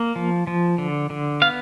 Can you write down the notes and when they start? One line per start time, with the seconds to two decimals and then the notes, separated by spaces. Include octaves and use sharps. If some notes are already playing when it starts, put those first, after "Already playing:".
Already playing: A#3
0.16 F3
0.47 F3
0.78 D3
1.10 D3
1.42 B3 F5